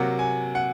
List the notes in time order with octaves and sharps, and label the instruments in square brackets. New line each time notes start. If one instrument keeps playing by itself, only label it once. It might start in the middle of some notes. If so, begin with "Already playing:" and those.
Already playing: [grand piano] C3 F#3 A#3 F#5
G#5
F#5